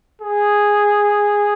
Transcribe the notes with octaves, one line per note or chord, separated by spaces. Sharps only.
G#4